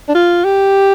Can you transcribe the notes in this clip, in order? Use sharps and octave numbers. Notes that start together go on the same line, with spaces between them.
D4
F4
G4